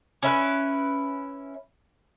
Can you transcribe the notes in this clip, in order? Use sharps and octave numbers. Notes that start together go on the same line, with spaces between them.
C#4 E4 A#4 B4